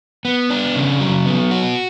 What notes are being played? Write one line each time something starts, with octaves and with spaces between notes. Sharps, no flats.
B3
D4
C#3
F#3
B3
F#4